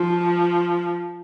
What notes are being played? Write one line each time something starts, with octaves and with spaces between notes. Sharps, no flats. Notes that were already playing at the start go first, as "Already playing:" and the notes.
Already playing: F3